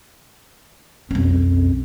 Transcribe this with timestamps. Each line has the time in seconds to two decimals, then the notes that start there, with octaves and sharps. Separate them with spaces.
1.11 B1 F2 C#4